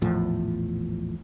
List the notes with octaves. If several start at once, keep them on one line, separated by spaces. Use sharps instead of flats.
A#1 E2 A2 F3